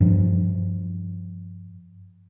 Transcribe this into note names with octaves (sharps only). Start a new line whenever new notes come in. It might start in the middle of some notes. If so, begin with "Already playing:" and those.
G2 F3